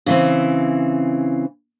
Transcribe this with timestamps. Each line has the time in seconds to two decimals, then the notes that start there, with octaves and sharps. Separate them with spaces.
0.06 C#3 E3 C4